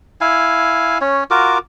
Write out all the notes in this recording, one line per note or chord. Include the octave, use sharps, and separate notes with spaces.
E4 F5 G#5
C#4 C#5
F4 F#4 A#4 D6